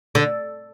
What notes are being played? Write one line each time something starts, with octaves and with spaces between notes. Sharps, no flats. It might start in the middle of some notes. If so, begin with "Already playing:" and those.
D3